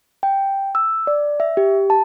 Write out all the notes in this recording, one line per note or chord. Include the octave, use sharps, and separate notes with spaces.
G5
E6
D5
E5
G4
A5